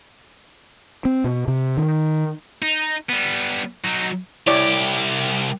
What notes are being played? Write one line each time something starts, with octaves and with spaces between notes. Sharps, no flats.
C4
B2
C3
D#3
D#4
G3 B3
F#3 D#4
C2 E4 G4 C#5 D5